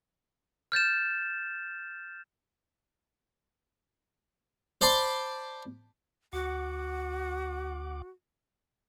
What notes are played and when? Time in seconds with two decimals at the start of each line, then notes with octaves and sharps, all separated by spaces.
0.72 F6 G6 A6 E7
4.81 C5 D5 A5 B5 C6
6.33 D2 F#4 F#5 D6